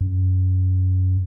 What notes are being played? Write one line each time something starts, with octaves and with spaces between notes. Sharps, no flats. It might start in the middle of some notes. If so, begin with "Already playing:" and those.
F#2